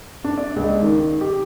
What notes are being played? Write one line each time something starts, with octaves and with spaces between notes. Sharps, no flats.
D4
D5
C#2
D#3
G4